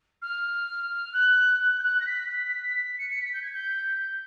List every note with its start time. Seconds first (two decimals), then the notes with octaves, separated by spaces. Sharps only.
0.22 F6
1.13 F#6
1.59 F#6
1.78 G6
1.83 F#6
2.00 A#6
2.06 B6
2.29 B6
2.98 C#7
3.10 C#7
3.22 B6
3.33 G6
3.42 G#6
3.53 G6